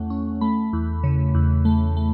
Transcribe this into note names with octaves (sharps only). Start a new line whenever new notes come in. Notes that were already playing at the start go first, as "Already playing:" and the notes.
Already playing: E2 A3 C#4 F#5
C#4
A3 B5
E2
C#3
E2
A3
A3